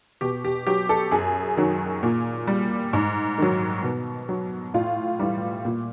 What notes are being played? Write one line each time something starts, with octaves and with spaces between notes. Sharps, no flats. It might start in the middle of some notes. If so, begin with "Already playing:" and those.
B2 G4
G4
F#3 G4
A4
F#2 G#4
D#3 F#3
A#2
G3
G#2
D#3 F#3
B2
F#3
A2 F4
E3 G3
A#2